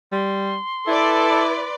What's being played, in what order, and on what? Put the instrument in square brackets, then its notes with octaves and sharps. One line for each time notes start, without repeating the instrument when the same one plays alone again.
[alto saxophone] G3 [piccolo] C6
[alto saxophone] E4 [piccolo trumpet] A4 [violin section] B4 D5